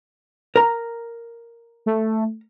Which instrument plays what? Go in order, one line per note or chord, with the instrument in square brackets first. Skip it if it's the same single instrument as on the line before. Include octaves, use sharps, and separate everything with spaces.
[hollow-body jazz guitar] A#4 A#5
[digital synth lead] A3